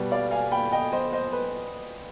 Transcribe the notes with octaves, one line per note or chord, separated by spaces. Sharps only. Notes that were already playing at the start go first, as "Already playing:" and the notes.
Already playing: B2 G3 B3
D5 F5
F5 G#5
G5 B5
D#5 G5
C5 D#5
C5 D#5
B4